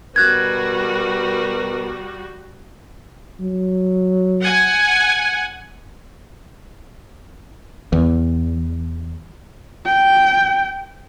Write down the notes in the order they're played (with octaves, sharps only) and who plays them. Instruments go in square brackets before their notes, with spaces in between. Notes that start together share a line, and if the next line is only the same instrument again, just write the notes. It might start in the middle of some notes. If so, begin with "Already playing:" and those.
[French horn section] B2 A#4 B4 [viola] G3 F#4 [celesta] F#6 G#6
[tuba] F#3
[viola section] F#5 G#5
[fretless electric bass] E2
[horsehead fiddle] G5